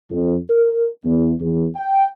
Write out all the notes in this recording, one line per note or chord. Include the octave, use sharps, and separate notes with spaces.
F2
A#4
E2
E2
G5